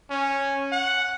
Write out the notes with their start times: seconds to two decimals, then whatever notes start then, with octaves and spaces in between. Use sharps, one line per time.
0.10 C#4
0.72 F#5